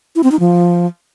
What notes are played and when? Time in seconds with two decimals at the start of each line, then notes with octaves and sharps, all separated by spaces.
0.16 E4
0.24 C4
0.32 D#4
0.40 F3